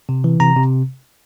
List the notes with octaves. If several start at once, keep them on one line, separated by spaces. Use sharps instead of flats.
C3
E3
C3 A#5
C3